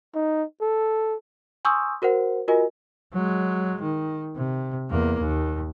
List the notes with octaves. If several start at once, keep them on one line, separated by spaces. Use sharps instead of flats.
D#4
A4
G#5 C6 C#6 D#6 E6 G6
F#4 A#4 C5 F#5
F4 F#4 A#4 D#5 G#5
F#3 G#3
D#3
C3
E2 A#3
D#2